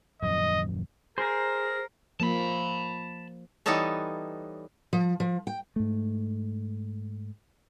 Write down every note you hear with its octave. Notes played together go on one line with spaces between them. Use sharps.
D#1 F#2 F3 D#5
G#4 A#4 C5 A#5
F3 A#3 A5 B5
E3 G3 B3 D#4 A4 C#5
F3
F3
G5
G#2 A3